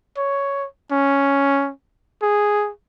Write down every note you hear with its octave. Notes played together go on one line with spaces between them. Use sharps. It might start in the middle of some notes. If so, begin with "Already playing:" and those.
C#5
C#4
G#4